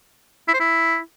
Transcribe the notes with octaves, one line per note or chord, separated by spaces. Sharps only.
E4
C5
E4